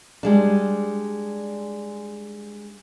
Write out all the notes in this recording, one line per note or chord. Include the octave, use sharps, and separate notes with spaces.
G3 G#3 D4